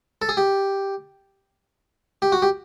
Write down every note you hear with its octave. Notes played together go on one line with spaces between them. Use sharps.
A4
G#4
G4
G4
F#4
G4